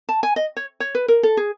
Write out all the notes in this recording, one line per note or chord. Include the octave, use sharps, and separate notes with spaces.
A5
G#5
D#5
C#5
C#5
B4
A#4
A4
G#4